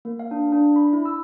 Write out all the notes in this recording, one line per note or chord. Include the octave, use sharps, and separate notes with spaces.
A#3
F5
D4
D4
B5
E4
E6